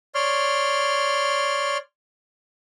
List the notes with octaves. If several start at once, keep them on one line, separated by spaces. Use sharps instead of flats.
C#5 D5 C6 F6